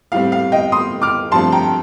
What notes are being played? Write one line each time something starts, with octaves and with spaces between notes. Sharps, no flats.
A2 G3 C4 F5
F5
D#5 G5
C6 D#6
D6 F6
G2 F3 A3 C4 A5 C6
G5 A#5